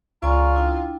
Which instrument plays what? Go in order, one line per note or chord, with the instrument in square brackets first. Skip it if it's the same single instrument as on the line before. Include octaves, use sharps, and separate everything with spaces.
[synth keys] C#2 [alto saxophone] F4 [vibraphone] D5 G#5 C#6 [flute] A#5
[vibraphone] D4 E4 G5